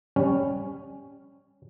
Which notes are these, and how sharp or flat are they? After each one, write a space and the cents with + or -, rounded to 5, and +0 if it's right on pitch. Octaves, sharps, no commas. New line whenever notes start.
G3 +15 C#4 +0